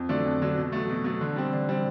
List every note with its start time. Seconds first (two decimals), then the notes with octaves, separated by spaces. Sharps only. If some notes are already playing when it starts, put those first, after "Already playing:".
Already playing: F2
0.09 D3 F#3 A3 D4
0.25 F2
0.42 D3 F#3 A3 D4
0.57 B2
0.72 F#3 A3
0.89 B2
1.04 F#3 A3
1.21 D3
1.36 G3 C4
1.53 D3
1.69 G3 C4